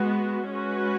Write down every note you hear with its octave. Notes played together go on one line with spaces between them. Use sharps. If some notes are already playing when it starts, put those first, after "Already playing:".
Already playing: G#3 B3 F#4
G#3 C#4 F#4 B4